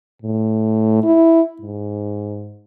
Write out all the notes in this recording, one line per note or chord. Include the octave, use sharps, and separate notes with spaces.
A2
E4
G#2